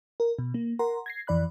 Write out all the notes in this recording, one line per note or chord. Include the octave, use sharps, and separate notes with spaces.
A#4
B2
A#3
A#4 F#5 A#5 C6
G#6 A#6 C7
F2 E3 D5 B5 F#6